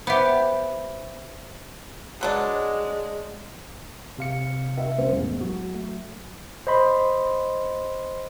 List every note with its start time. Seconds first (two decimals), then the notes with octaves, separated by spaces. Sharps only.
0.07 B3 G4 C5 E5
2.21 B2 F#3 G#3 D4
4.18 C3 F5 C#7
4.77 E5
4.98 C2 C#4 C5
5.13 E2 A2 G#3
5.41 F#3 F#4
5.74 A3
6.67 C5 D#5 B5 C6